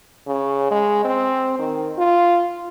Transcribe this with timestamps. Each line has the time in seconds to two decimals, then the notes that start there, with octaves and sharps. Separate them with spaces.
0.27 C#3
0.71 G#3
1.05 C4
1.59 D#3
1.98 F4